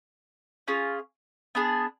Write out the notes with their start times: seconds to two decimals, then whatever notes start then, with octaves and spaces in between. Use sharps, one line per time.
0.68 C#4 F4 G#4
1.55 B3 D4 G#4